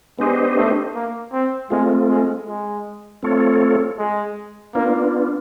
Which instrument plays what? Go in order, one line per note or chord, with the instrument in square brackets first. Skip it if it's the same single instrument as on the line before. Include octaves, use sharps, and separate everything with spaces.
[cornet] G#3 [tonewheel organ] B3 D4 G4 C5 D#5
[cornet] A3
A#3
C4
[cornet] G#3 [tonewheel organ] A3 C4 F4
[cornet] G#3
G#3
[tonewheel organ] A3 C4 F4 A4 C#5
[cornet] G#3
[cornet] A#3 [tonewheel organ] B3 D4 F4